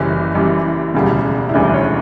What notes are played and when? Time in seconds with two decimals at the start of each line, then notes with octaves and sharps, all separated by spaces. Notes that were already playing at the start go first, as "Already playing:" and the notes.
Already playing: F#1 F#2 E3 G3 C#4
0.35 F#1 F#2 E3 G3
0.94 E1 D2 C#3 G3
1.49 E4
1.54 E1 D2 C#3 G3 D4
1.74 C#5